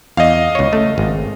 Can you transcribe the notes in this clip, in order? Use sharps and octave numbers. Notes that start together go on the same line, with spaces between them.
E2 D#5 F5
C#2 C#5
A3
G#1